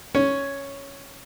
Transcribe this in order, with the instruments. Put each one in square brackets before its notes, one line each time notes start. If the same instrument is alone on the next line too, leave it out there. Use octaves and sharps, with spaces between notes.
[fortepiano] C#4 C#5